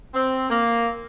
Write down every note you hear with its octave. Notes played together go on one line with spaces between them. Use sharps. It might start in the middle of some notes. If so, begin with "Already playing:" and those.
C4
A#3